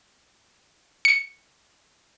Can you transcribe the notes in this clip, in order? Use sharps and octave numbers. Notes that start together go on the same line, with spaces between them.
C#7